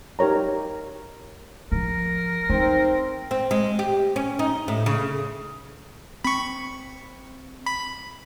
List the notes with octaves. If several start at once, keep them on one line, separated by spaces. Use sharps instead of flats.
D#4 G4 A#4 C#5 A#5
F3 A#4
C4 D#4
C4
G#3
G4
C#4
D#4
A2
C#3
C4 B5 C#6
B5